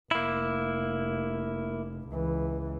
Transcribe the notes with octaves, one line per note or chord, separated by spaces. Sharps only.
F1 A#3 E4
C#2 E3